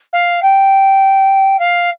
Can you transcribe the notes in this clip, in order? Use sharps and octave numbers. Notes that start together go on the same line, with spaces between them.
F5
G5
F5